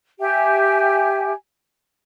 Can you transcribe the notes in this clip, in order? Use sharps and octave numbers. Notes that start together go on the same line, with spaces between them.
G4 E5 G5 G#5